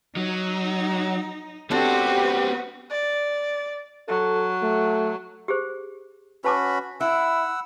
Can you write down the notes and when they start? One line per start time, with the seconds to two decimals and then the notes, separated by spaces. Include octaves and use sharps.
0.16 F#3 D#4
1.71 B3 C4 D4 F#4 G4 A4 B4 C5
2.90 D5
4.08 F#3 A4
4.62 A3
5.48 G4 G#4 C5
6.44 C#4 F#4 B4 A5 B5 D6
7.01 E4 F#5 E6